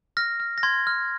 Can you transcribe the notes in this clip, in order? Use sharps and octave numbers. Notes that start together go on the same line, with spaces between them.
F6 A#6
F6
A#6
C6 G#6
F6